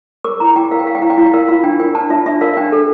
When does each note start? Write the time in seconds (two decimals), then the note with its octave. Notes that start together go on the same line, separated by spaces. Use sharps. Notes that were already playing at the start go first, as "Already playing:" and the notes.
0.24 A#4 D6
0.40 E4 A#5
0.55 E4 G5
0.71 A#4 F5
0.79 G5
0.87 A#4 F5
0.95 G5
1.02 E4 F5
1.10 G5
1.18 E4 F5
1.26 G5
1.33 A#4 F5
1.48 F4 F5
1.63 D4 G5
1.80 A#4 G5
1.95 D4 A5
2.10 F4 E5
2.26 D4 E5
2.41 A#4 F5
2.57 D4 G5
2.72 A4